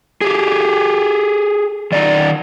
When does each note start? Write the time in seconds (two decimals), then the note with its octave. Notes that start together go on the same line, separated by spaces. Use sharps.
0.21 G4 G#4
1.92 D#3 D5 D#5 A#5